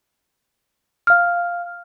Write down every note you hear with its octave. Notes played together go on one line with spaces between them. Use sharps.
F5 F6